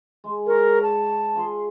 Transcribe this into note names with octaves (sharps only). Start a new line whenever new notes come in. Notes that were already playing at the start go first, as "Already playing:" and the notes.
G#3
G#4 A#4 C#5
A5
F4 G#4 C6